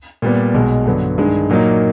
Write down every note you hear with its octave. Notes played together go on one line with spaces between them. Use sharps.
A#2 G3 B3
B1 B2 G#3
G2 D3 F#3 B3
G2 D#3 G#3
A#2 F#3 A#3 D#4